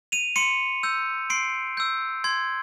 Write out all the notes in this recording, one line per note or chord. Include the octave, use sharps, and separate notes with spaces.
D#7 F7
C6 C#7 D#7
E6 G6
C6 C7 D7
E6 G6
C6 G#6